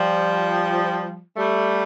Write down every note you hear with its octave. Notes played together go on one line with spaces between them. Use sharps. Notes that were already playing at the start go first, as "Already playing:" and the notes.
Already playing: F3 G3
G3 A3